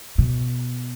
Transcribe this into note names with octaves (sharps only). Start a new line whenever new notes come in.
B2